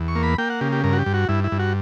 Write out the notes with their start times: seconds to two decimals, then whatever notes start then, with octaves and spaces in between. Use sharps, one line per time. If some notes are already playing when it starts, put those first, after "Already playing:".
Already playing: E2
0.08 C#6
0.15 A#3
0.23 B5
0.38 A#3 G5
0.50 F#5
0.61 C#3 G4
0.72 G4
0.84 G2 A#4
0.93 F#4
0.99 G4
1.06 G2
1.14 F#4
1.29 G2 E4
1.44 E4
1.52 G2
1.59 F#4